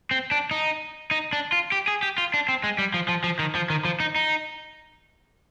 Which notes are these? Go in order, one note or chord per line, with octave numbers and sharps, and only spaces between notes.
C4
D4
D#4
D#4
D4
F4
G4
G#4
G4
F4
D4
C4
G#3
G3
F3
F3
F3
D#3
F3
D#3
F3
D#4
D#4